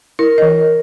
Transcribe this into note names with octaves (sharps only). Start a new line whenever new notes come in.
E4 A#4
E3 D#5